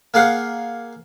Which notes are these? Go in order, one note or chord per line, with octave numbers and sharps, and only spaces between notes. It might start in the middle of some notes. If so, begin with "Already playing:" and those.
A#3 G#4 F5 F#5